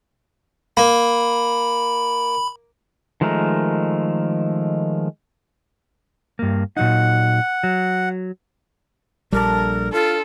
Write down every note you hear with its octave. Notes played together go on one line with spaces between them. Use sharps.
A#3 B5
D#3 F3 G#3 A3 A#4
G2 A#3
A#2 F#3 D#4 F#5
F#3
A#1 G3 D4 A4 A#4 D5
F4 A4 C6